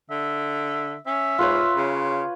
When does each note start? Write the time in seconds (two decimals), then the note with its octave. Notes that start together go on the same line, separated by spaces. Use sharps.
0.10 D3 E5
1.06 C#4 E5
1.38 G#2 F4 B4 C#5
1.76 C#3